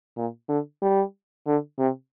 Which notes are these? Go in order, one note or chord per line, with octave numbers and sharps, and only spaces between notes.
A#2
D3
G3
D3
C3